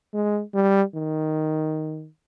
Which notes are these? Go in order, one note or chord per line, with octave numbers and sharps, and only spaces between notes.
G#3
G3
D#3